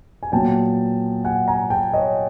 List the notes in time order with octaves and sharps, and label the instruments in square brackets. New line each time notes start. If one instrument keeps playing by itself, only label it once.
[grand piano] G#5
A#2 F#3 B3 G5 A5
F#5 G#5
G#5 A#5
G5 A5
C#5 D#5